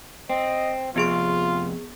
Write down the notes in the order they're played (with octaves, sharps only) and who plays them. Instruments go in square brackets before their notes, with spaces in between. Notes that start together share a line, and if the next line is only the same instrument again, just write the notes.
[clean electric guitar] C4 [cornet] D#5
[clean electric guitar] F2 C3 [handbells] B3 G#4 C#6 [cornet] F4